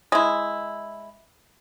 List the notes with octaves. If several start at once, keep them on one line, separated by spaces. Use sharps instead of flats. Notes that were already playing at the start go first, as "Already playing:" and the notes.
G#3 E4